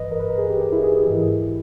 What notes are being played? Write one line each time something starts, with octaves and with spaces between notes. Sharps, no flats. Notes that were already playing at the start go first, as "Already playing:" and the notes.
Already playing: G2 E3 B4 D#5
A#4
B4
A#4
G#4
G4
G4
E4
G#4
G4
G#2 E3 E4